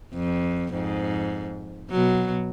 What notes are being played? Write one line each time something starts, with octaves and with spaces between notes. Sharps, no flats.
F2
F2 G#2
B2 F#3